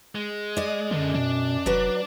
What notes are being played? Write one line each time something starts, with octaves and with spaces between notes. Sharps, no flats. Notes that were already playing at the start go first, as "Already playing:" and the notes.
G#3
D5 D#5
F#2 D3 G#3 D4
B2 D4
F1 F#3 B4 D5